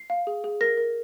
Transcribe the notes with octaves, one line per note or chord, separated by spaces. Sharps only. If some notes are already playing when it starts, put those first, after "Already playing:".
Already playing: C7
F5
G#4
G#4
A#4 A#6
A#4